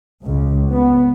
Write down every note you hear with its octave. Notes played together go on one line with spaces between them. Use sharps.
C#2
B3